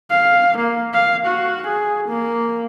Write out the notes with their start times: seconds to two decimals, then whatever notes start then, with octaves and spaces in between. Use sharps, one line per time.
0.11 F5
0.58 A#3
0.94 F5
1.26 F#4
1.67 G#4
2.08 A#3